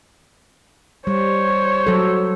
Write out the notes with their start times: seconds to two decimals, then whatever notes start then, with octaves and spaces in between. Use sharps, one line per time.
1.07 G3 C5 C#5
1.87 F#3 A4